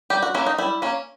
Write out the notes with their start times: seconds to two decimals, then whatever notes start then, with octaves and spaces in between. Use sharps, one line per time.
0.10 G3 G4
0.22 F#4
0.34 A#3 C#4 E4
0.46 D#4
0.58 G3 E4
0.82 A#3 C#4